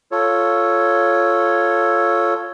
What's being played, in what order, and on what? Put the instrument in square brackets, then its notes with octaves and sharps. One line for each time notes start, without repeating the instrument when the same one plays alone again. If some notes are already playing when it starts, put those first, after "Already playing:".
[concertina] F4 A4 C#5